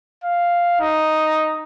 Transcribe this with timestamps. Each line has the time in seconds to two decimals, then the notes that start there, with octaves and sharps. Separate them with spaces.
0.24 F5
0.80 D#4